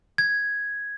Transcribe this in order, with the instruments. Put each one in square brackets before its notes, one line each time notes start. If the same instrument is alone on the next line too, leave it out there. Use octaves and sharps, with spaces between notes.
[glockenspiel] G#6